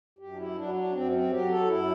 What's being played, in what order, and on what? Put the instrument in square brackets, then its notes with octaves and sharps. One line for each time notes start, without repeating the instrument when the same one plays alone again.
[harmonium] F#2 G4
D4
E4
F#3 D4
D4
F#2 C4
C4
F#3 G4
A4
F#2 E4